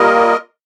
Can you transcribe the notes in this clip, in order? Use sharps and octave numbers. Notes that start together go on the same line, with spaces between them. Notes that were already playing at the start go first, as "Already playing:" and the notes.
Already playing: G3 A#3 F4 A#4 D#5